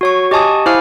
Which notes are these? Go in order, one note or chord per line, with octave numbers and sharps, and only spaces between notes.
F#4 C#5 C#6
G4 D#5 G#5 A5 C#6 D#6
E4 C5 F5 G#5 D6 F6